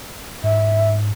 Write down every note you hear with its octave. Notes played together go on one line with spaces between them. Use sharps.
G#2 E5